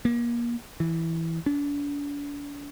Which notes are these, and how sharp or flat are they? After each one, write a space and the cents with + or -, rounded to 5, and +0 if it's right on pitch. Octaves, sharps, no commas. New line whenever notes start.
A#3 +30
E3 -5
D4 -40